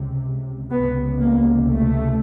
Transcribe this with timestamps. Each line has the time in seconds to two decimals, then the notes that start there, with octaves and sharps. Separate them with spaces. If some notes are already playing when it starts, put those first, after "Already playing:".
Already playing: C#2 C3
0.72 C#2 C3 B3
1.19 A#3
1.67 A3